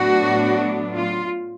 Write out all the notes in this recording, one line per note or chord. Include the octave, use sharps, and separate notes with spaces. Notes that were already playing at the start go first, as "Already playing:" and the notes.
Already playing: A2 F#3 B3 D4 F#4
F4